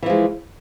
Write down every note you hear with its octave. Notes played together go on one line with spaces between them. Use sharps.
E3 F3 G#3